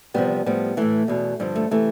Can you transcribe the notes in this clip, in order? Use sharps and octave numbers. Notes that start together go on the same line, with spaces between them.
E2 C3 F3 G3 B3
A2 F3 G3 B3
A2 E3 A3
E2 B2
G2 D3 F3
A3
C3 E3 A3